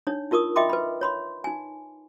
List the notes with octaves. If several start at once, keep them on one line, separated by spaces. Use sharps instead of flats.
D4 D#4 C#5
D#4 F4 A#4 C#6 D#6
D#5 E5 G5 B5 C6 D6
B4 B5
C#5 B5 C6
D#4 G#5